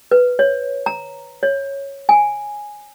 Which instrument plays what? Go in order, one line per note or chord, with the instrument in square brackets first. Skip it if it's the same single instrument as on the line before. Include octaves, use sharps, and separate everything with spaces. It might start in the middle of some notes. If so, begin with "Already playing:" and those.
[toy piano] B4
C#5
A#5
C#5
G#5